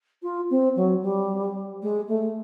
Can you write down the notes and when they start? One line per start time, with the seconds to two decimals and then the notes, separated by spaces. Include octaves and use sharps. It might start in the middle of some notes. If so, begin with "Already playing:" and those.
0.23 F4
0.50 C4
0.76 F#3
1.02 G3
1.82 G#3
2.09 A3